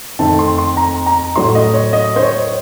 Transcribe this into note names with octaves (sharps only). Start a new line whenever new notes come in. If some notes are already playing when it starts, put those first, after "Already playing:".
F2 D#3 A3 C4 A5
C6
C6
A#5
A#5
A2 F#3 A3 C6
D#5
C#5
D#5
C5
C#5